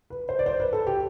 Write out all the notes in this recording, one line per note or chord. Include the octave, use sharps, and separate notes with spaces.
B4
C5
D5
C5
B4
A4
G4